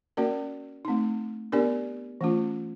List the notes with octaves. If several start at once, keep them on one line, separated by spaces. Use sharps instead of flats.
A#3 C#4 F#4 A#4 D5
A3 C4 D#4
B3 D4 G4 A#4 D5
E3 A3 C#4 F4